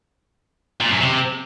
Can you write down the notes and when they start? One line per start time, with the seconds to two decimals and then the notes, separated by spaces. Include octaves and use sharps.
0.80 A#2
0.90 F#2
1.01 C3